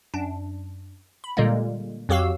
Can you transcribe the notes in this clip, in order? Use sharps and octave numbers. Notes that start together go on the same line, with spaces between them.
F#2 D4
B5
A#2 D3 G3 G#3 A#3
F2 F#3 F#4 G4 F5 E6